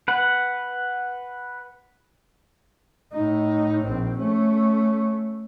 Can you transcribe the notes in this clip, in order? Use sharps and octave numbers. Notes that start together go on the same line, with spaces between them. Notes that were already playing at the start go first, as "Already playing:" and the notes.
B4 F#5
A2 D#4
A#1 C4
A3 C#4